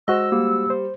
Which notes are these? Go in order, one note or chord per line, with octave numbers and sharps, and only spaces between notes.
G#3 F#4 C5 D#5 E6
G3 A#3
C5